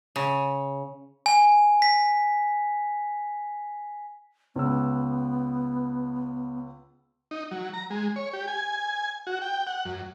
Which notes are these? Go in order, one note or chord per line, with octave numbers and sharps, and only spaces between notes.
C#3
G#5
B6
C#2 B3 E6
D#4
F#3
A#5
G#3
C#5
G4
G#5
F#4
G5
F#5
F#2